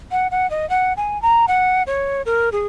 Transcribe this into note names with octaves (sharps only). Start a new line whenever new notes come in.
F#5
F#5
D#5
F#5
G#5
A#5
F#5
C#5
A#4
G#4